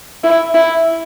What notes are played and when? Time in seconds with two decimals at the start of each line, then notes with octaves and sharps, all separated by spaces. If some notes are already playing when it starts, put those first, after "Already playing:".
0.24 E4
0.54 E4